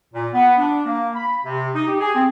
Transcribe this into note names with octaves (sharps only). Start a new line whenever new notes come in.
A#2
B3
D4
A#3
B5
C3
D#4
G4
G#4
C4